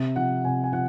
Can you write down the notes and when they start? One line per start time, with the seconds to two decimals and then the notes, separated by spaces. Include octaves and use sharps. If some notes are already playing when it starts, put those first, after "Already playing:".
Already playing: C3
0.16 F3 F#5
0.44 C3 G#5
0.64 G#5
0.73 F3 F#5